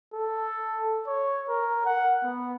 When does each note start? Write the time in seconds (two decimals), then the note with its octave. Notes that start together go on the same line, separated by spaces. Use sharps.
0.14 A4
1.07 C#5
1.49 A#4
1.85 F#5
2.23 B3